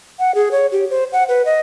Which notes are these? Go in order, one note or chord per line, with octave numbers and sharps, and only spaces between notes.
F#5
G#4
C#5
G4
C5
F#5
B4
D#5